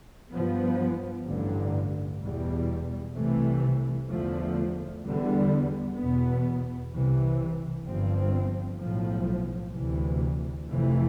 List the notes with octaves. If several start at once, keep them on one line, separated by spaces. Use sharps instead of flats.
G2 F3 B3
A1 G2 D3
E2 B2 G3
C2 C3 E3 A3
E2 D3 F3 A3
E2 D3 G3 B3
E2 B2 B3
C2 C3 E3
G1 G2 F3 C4
B1 A2 F3
D2 C3 E3
F1 F2 C3 E3 A3